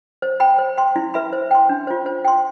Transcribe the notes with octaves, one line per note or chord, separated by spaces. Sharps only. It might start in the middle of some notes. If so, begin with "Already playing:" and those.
C5
G5 B5
C5
G5 C6
E4
B4 E5 B5
C5
G5 C6
D4
F4 C5
C5
G5 C6